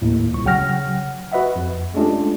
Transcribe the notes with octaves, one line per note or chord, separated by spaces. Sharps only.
D#2 A2
C2 A#2 C#6
C#3 F#3 F#5 G5 F6 A#6
F#4 B4 D#5 E5 F#5
F2
G#3 A3 C#4 D4 F4 G4